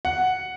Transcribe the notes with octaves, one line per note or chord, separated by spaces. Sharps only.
F#5